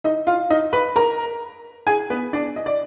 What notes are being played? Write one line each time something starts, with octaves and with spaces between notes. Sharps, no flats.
D#4 D#5
F4 F5
D#4 D#5
B4 B5
A#4 A#5
G#4 G#5
B3 B4
D4 D5
D#5
D5